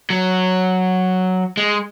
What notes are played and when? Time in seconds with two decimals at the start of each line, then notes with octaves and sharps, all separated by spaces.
0.10 F#3
1.57 G#3